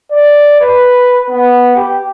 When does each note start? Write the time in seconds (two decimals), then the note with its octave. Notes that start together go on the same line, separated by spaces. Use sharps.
0.12 D5
0.61 B4
1.30 B3
1.76 G4